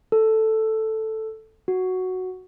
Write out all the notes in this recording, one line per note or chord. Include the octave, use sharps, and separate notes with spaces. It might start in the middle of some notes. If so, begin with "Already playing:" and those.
A4
F#4